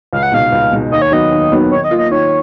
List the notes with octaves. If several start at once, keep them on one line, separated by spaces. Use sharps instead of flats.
C#2 F5
F#5
B2 G#3 D#4 F5
C#2
B2 G#3 D#4
D#2 D#5
C#5
D#3 F#3 B3 D#5
D#2
D#3 F#3 B3
D#3 C#5
D#5
A#3 F4
D#5
D#3 C#5